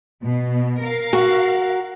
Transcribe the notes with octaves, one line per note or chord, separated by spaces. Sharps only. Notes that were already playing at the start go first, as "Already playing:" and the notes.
B2
A#4 F5
F#4 F#5